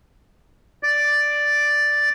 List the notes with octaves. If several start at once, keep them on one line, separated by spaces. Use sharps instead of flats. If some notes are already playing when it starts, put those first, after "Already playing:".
D5